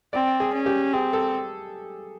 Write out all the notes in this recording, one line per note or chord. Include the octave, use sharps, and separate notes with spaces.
C4 D5
G#4
C#4
G4
C4 G#4
A4